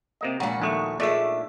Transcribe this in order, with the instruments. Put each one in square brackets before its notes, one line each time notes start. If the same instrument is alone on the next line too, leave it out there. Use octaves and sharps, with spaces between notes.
[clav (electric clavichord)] C3 A#3 D#5
[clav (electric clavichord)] A#1 [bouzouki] A#2 F#4 [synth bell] G#3 A#5
[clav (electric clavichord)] A#1 D#2 A3 [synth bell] F3 D#4 D#6
[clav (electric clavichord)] A#2 A3 D5 [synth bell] A#3 G#4 E6 [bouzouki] D4 E5